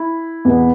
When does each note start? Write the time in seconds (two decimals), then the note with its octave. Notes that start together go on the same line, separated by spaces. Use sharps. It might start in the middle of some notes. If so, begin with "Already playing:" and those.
Already playing: E4
0.45 E2 B2 B3